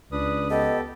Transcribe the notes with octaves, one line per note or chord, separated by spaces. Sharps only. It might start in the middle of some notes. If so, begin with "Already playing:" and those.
C#2 D4 B4 D#6
B3 G4 A4 D#5